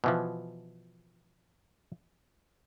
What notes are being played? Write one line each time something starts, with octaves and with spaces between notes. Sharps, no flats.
B2 E3 F3